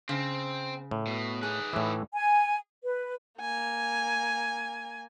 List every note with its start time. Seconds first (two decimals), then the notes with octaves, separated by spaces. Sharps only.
0.09 C#3 C4
0.91 A2
1.07 B2
1.43 D#4 G#4 B4
1.73 A2 E3
2.13 G#5
2.83 B4
3.40 A#3 G#5